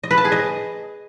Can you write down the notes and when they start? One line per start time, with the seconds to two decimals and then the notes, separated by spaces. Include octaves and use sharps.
0.03 D#5
0.11 B4
0.18 A5
0.25 G#4
0.32 D#5